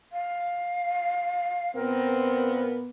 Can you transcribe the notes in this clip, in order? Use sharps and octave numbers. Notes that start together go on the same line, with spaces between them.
F5
A#2 B3 C4 A#4